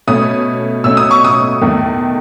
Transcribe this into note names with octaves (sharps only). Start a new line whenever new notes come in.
B2 A3 C#4 D#6
B2 A3 C#4 E6
D#6
C#6
D#6
E2 D#3 A3